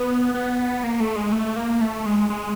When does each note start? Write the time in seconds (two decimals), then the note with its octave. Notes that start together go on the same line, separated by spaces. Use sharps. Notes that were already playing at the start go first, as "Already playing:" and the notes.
Already playing: B3
0.34 B3
0.84 A#3
1.00 A3
1.16 G#3
1.32 A3
1.56 A#3
1.81 A3
2.06 G#3
2.30 G#3